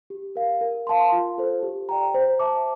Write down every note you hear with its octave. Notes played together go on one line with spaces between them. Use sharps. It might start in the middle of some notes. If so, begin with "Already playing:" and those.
G4
A#4 F5
A#4
F5 A5 C6
F4
A4 C5
G4
D5 G5 A#5
C5
E5 A5 D6